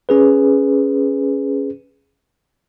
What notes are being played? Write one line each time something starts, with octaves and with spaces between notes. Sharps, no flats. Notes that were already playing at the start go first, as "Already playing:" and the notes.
C#4 G#4 B4